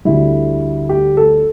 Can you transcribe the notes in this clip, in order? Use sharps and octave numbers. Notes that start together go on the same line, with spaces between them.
D2 D3 G3 E4
G4
A4